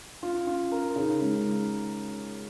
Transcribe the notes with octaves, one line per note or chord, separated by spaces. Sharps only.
C#4 F4
C#4 F4
C#4 A#4
C#3 D#4
C#3 G#3